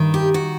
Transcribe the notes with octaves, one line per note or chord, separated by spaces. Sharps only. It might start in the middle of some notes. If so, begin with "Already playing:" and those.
Already playing: G2 D#3
G4
F#4